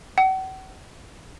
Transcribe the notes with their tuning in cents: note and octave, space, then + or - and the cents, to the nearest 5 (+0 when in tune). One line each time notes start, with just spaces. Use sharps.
F#5 +40